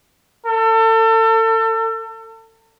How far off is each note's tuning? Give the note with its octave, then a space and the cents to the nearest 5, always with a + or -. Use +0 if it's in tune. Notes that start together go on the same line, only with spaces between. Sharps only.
A4 +35